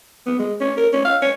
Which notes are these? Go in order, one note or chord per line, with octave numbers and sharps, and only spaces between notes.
B3
G#3
C#4
A#4
C#4
F5
C#5